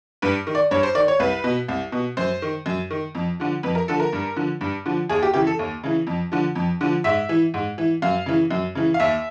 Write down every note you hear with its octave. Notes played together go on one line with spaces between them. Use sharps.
G2 B4
D#3
D5
G2 C#5
C5
D#3 D5
C#5
C2 B4
B2
C2
B2
F#2 C5
D#3
F#2
D#3
F2
D3 F3
F2 B4
A#4
D3 F3 A4
A#4
G2
D3 F3
G2
D3 F3
D#2 G#4
G4
C#3 E3 G4
A4
D#2
C#3 E3
F2
D3 F3
F2
D3 F3
G#2 E5
E3
G#2
E3
F#2 F5
C#3 E3
F#2
C#3 E3
F5
D#2 E5